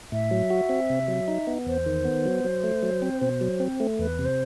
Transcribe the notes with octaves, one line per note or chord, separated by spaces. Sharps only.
A2 E5
F#3
F#4
C4
C3
F#3
D#4
B3
E2 C5
D#3
B3
F#3
F#3
A3
F#3
C4
B2
F#3
C4
A3
E2 B4
C3
C5